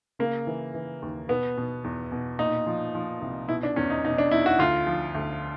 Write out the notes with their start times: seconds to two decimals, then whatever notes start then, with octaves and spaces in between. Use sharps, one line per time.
0.19 C#3 A#3
0.47 E3
0.74 E3
1.02 D#2
1.29 B2 B3
1.57 B2
1.84 E2
2.12 B2
2.39 A#2 D#4
2.67 F3
2.95 F3
3.22 C2
3.49 B2 E4
3.63 D4
3.76 E2 C#4
3.90 D#4
4.05 B2 D#4
4.18 D4
4.31 E2 E4
4.46 F#4
4.59 D2 F4
4.87 F3
5.15 D2